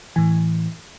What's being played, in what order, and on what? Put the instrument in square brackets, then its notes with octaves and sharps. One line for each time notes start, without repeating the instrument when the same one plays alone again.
[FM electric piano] A2 E3 G#5